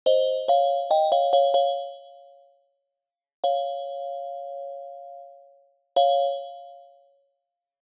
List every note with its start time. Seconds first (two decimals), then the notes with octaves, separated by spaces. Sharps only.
0.06 C5 D#5
0.48 C#5 F5
0.91 D#5 G5
1.12 C#5 F5
1.33 C#5 F5
1.54 C#5 F5
3.44 C#5 F5
5.96 C#5 F5